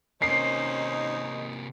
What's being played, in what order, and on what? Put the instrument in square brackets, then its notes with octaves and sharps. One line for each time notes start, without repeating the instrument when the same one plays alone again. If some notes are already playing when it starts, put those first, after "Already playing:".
[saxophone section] D#2 D#4 [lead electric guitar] C3 A#3 [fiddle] C#4 C5 [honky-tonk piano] C7